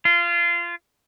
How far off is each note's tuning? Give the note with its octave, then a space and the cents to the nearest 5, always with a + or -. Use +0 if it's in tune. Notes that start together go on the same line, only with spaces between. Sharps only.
F4 -20